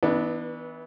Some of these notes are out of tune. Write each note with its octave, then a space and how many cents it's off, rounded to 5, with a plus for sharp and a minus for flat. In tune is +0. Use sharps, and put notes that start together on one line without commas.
E3 -25 B3 +0 D4 +25